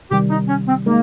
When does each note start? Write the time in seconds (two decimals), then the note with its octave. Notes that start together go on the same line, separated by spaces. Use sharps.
0.11 C3 D#3 G3 G4
0.30 D#4
0.48 C#4
0.67 C4
0.86 G#3 A#3 D#4 A#4